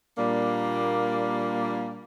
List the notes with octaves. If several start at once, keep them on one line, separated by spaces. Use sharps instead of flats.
A#2 G3 A#3 D4